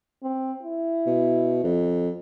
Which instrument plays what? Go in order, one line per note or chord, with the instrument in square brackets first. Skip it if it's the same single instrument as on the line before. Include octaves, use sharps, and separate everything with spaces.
[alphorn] C4
E4
[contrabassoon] B2
F2